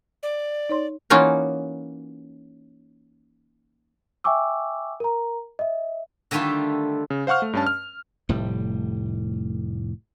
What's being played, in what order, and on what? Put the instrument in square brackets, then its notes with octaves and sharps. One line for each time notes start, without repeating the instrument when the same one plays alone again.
[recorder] D5
[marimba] D#4 C#5 C6
[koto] E3 A#3 C#4 D#4 F4 F#4
[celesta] E5 G5 G#5 C#6 D6 E6
A#4 A#5
D#5 E5
[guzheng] D3 D#3 G3 A3 F4 E5
[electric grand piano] C#3
C5 F5 F#5 C#6 F6
A3
G2 C#4 A5
F6
[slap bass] F1 A2 G3